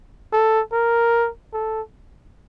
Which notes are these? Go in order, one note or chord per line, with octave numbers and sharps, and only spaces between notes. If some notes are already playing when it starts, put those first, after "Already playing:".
A4
A#4
A4